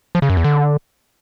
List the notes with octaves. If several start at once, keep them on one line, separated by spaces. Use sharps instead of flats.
F3
C#3
F#2
E2
D3